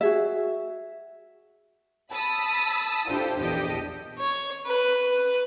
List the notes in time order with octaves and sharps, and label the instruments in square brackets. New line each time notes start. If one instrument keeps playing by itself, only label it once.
[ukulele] F#4 G#4 E5
[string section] A5 B5 D#6 E6 B6
D4 E4 F4 G4 A4 C5
A#1 E2 D4 G4 A4 D#5
[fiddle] C#5
B4